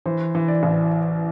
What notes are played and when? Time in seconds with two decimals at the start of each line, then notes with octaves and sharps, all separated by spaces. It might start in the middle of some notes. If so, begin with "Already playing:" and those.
0.06 E3 C5
0.35 E3
0.48 D5
0.63 A1